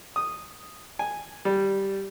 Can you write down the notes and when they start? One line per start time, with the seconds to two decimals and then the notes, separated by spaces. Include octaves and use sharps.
0.16 D#6
0.99 G#5
1.45 G3